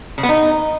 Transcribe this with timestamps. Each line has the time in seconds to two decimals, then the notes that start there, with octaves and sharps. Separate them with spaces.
0.18 C#3
0.23 B3
0.29 D#4